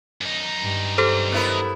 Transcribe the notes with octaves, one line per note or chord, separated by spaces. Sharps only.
F#2 D#4
G2
G4 A4 C5
B3 E4 A#4